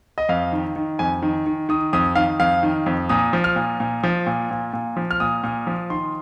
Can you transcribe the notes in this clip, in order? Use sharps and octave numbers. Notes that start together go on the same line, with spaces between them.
D#5
F2 F5
D#3
D#3
F2 G#5
D#3
D#3
D#3 D#6
F2 D#6
D#3 F5
F2 F5
D#3
F2
A#2 D#6
F3
F6
A#2
A#2
F3
A#2
A#2
A#2
F3
F6
A#2 D#6
A#2
F3
D#3 C6